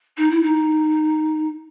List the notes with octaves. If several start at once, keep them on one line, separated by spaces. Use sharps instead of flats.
D#4
E4
D#4